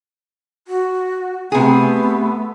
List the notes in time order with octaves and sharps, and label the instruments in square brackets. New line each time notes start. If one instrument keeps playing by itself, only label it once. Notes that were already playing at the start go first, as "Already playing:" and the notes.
[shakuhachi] F#4
[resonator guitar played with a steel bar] C3 G#4 [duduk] A3 [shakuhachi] B3